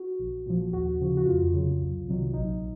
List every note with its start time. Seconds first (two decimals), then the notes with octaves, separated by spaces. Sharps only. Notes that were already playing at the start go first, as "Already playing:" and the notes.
Already playing: F#4
0.19 A#1
0.46 A#2 F3
0.73 D#2 F#4
1.00 C#3 F3
1.17 F#4
1.26 F2 F4
1.54 C#3 F#3
1.81 C2
2.07 C3 D#3 F#3
2.34 A#1 D#4